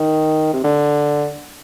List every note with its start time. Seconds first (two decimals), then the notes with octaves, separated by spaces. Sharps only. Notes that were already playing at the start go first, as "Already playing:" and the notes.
Already playing: D#3
0.53 C3
0.64 D3